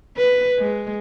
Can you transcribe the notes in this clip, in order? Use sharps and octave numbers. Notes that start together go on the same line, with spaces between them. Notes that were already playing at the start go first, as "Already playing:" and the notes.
B4
G#3